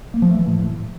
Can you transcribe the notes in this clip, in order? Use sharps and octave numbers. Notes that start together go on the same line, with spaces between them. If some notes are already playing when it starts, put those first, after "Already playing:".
A#3
F3
A3
E3
A2